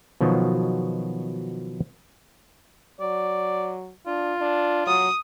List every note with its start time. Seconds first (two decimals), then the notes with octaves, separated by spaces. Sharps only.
0.21 B2 D#3 F3 F#3
3.00 F#3 D5
4.07 D4 F4
4.41 D4
4.87 F#3 D#6